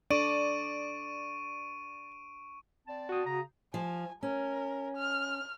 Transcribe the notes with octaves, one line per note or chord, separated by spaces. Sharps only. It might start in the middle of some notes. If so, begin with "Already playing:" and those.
D4 A4 D5 C#6 D7 D#7
C4 D5 A5
F#4 D#6
C#3 A#5
F3 G#5
C#4 A#4
F6